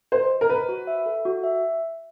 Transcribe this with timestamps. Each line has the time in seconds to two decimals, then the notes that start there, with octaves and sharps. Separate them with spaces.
0.12 C5 D#5
0.31 D#5
0.41 A#4
0.49 B4 C5
0.69 F#4
0.87 E5
1.06 A4
1.25 F#4
1.44 E5